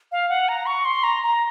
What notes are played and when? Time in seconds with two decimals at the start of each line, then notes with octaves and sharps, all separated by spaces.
0.12 F5
0.29 F#5
0.49 A#5
0.66 C#6
0.85 C6
1.04 A#5
1.23 A#5